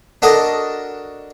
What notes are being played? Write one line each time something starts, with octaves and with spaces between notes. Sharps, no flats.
D4 F#4 A4 A#4 D#5